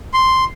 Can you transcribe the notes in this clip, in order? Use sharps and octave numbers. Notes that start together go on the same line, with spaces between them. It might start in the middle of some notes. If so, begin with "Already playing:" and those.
C6